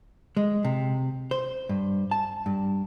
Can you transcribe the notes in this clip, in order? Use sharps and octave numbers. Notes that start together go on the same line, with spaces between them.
G#3
C3
C5
G2
A5
G2